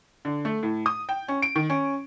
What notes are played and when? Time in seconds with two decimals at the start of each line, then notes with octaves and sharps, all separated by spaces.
0.25 D3
0.45 A3
0.63 A2
0.86 D#6
1.09 G5
1.28 C#4
1.42 D7
1.56 D#3
1.70 C#4